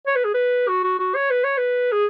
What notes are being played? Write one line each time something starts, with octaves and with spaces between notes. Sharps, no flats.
C#5
B4
G#4
B4
F#4
F#4
F#4
C#5
B4
C#5
B4
G#4